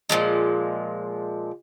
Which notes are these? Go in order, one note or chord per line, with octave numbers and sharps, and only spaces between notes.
A#2 D#3 F3 G#3